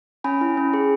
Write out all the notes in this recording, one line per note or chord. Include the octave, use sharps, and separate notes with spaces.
C#4 G#5 B5
E4
C#4
G#4